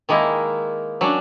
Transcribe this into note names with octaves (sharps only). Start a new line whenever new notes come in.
D#3 G#3 A#3 D#4 E4
F#3 C#4 D4